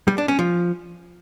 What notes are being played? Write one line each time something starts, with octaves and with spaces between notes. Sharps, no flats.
G3
D4
C#4
F3